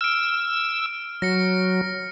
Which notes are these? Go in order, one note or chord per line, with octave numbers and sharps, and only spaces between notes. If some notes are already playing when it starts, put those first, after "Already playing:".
E6 F6 D7
F#3 A#6 C#7